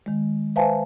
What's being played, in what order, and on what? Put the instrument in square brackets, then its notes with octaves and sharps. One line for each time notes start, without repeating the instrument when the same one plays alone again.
[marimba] D#3 G#3
B4 C5 E5 F5 G#5 A5